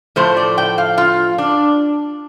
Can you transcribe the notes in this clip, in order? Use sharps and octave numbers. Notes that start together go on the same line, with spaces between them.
A2 F3 A3 C5
D5
G5
F5
F4
D4